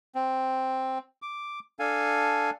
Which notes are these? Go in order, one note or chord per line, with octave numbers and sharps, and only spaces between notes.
C4
D6
D4 A4 F5 G#5